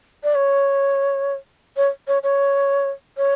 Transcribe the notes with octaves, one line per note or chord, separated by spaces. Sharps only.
D5
C#5
C#5
C#5
C#5
C#5